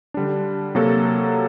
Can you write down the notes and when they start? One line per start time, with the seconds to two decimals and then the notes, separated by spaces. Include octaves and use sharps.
0.14 D3 G3 D4
0.75 C3 F#3 A#3 F#4 A4